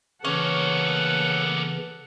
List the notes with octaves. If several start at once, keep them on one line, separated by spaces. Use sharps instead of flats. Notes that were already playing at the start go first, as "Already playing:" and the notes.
C#3 E3 A#3 B3 C#4 A4 F#5